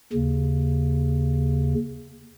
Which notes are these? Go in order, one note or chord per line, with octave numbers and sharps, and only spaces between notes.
D#2 C#3